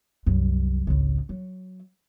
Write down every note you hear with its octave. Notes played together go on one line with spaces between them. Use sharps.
C2 F#2
G#1 C#2
F#3